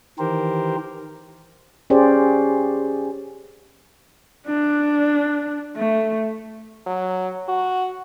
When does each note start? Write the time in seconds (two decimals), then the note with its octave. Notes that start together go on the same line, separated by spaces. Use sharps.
0.19 D#3 E3 G4 A#4 C5
1.90 C#4 G4 G#4 C5 D5
4.47 D4
5.76 A3
6.86 F#3
7.49 F#4